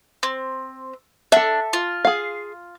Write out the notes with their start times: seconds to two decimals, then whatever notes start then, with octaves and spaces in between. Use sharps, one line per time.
0.23 C4
1.32 D4 A4 E5
1.73 F4
2.05 G#4 F5